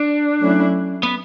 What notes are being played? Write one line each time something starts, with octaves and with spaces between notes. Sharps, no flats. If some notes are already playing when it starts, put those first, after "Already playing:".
Already playing: D4
F#3 A3 C#4 E4
B3